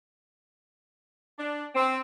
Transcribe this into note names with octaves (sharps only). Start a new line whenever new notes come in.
D4
C4